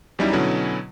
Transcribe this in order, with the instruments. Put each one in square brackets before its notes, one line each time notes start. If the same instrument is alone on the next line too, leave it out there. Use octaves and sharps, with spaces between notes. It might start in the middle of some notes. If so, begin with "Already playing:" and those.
[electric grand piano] E2 F#3 G3 C#4 D#4 E4
B2 D3 F#3 C#4 E4